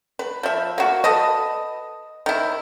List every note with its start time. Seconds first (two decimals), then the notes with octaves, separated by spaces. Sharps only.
0.19 B4
0.43 F3 E5
0.78 A#3 F#4
1.04 A4 B4 D#5
2.26 D#3 E4